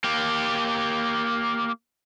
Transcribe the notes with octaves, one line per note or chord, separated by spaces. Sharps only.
A#3 G4